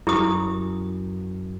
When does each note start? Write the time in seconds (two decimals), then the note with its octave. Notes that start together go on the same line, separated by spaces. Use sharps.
0.07 F#2 E4 G4 D#6